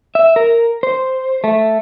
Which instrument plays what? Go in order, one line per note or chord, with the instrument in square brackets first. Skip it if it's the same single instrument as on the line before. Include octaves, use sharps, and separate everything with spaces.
[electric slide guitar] E5
A#4
C5
A3